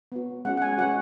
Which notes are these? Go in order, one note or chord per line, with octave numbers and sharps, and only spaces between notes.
B3 F#4
G#3 C#4 F#4 F#5
F#5
G#5
G#3 C#4 F#4 F#5